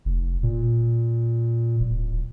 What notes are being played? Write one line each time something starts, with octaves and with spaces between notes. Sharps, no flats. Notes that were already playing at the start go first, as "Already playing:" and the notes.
F1
A#2
D1